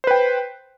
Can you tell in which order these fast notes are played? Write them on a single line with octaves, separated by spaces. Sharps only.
C5 B4 G5